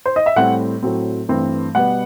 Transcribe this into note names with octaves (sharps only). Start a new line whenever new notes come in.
C5
D#5
E5
A2 G3 C4 F#5
A2 F#3 C4
G2 E3 A3 C4
B2 G3 B3 F#5